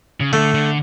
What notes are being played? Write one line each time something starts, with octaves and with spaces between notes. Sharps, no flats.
C#3
D3 A3
D3